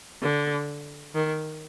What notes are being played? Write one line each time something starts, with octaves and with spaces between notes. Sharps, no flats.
D3
D#3